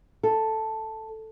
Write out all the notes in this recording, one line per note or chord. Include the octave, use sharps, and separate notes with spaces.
A4